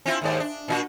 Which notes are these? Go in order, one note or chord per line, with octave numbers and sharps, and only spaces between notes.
C4 E4 F4
D#2 G#2 D5
D4
A#2 D#4 F#4